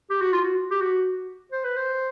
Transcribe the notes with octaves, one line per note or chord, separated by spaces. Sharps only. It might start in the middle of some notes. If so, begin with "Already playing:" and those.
G4
F#4
F4
F#4
G4
F#4
C5
B4
C5